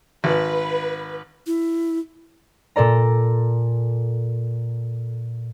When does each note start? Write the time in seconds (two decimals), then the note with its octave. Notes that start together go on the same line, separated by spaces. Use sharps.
0.24 G#1 B4
1.47 E4
2.76 A#2 A4 D5 A#5